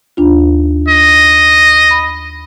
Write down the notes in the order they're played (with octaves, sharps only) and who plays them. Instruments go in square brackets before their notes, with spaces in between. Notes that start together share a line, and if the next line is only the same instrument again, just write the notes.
[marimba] D#2 D4 F4
[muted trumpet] D#5
[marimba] B5